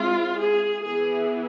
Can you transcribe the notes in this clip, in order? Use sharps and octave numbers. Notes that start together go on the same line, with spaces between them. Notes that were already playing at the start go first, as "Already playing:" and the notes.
Already playing: G#3 C4 E4 F4
G#4
E3 B3 E4 G#4